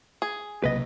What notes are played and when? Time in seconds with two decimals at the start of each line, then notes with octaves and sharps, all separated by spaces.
0.22 G#4
0.64 B1 C3 A#3 B4 D#5